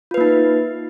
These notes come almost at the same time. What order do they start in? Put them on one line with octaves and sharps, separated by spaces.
F4 B4 A#3 D#4